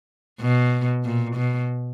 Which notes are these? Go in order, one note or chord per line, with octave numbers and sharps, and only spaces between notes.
B2
A#2
B2